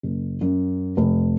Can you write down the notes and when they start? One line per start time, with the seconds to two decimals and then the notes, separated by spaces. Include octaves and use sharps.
0.03 F#1
0.41 F#2
0.97 F1